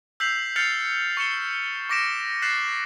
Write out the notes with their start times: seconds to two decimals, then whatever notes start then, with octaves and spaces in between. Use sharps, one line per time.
0.20 E6 G6 B6 C7 F7 F#7
0.56 F6 G6 A6 C7 C#7 F7
1.17 C#6 C7 C#7 E7 G7
1.89 C#6 D6 A#6 B6 D7 E7
2.42 F#6 A6 B6 C7 E7 F#7